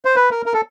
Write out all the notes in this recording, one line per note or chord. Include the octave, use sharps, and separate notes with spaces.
C5
B4
A#4
A#4
A4